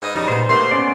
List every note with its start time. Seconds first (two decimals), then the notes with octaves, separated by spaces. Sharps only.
0.02 G#2 B4 D#5
0.15 F2 C#3 G3 D#4
0.28 A#2 B3 C5
0.49 E2 C3 A3 A#3 C6
0.71 B3 C#4 D5